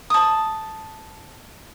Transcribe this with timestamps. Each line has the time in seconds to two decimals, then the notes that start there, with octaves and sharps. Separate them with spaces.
0.10 A5 D#6